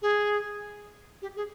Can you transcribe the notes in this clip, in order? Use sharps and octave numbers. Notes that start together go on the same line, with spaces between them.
G#4
G4
G#4